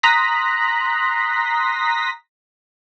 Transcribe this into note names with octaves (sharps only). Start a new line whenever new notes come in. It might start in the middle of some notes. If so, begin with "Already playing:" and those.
A#5 C6 D#6 F#6 A#6 B6